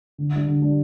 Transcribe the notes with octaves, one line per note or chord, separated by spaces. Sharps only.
D3
G3 D4
D3
G3 D4